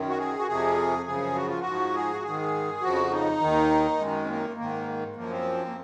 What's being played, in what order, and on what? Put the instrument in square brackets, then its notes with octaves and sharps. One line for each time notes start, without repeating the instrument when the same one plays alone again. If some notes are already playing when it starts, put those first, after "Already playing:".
Already playing: [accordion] F#2 D#3
F#4
G#4
F#4
F2 C3 F3 G#4
F#2 C#3 F3 G#4
F#4
F4
F#4
G#2 F3
G#4
F#4
G#2 D#3 G#4
F2 C#3 F3 F#4
D#4
D#2 D#3
F#2 D#3 G#3
C4
A#3
G#2 D#3 A#3
F#2 F3 A#3
C4
A#3